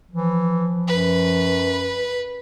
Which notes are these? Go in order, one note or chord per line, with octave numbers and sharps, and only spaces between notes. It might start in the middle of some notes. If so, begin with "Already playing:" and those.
E3 F3
F#2 B4